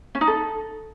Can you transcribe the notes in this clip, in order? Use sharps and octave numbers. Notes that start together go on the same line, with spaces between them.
C#4
D#4
A4